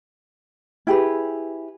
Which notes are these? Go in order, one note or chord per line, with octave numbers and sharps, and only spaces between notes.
E4 G4 G#4 B4